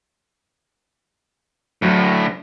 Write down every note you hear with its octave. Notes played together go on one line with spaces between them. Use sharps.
D2 A2 F#3